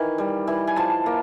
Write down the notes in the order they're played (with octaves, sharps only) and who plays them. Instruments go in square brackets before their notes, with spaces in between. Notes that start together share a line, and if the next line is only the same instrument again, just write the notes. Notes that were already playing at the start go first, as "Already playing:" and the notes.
Already playing: [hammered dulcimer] D#3 E3
G3
E3
G#5
F3 A5
A#3